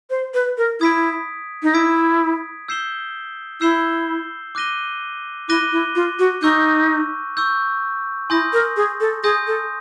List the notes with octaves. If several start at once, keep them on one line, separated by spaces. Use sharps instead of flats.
C5
B4
A#4
E4 D#6 G#6 B6 D7
D#4
E4 D#6 G#6 B6 D7
E6 G6 C7 E7 G7
E4 E6 G6 C7 E7 G7
D6 F#6 A#6 D#7 G7
E4 D6 F#6 A#6 D#7 G7
E4
F4
F#4
D#4 C#6 E6 G6
C#6 E6 G6
E4 G#5 C6 D#6 G6 A#6
A#4
G#4
A4
G#4 G#5 C6 D#6 G6 A#6
A4